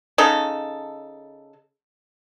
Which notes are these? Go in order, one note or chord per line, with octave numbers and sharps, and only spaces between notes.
C#3 D#4 A4